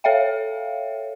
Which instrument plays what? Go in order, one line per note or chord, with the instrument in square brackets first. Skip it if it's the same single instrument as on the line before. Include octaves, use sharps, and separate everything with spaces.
[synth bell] A4 C#5 E5 F5 G5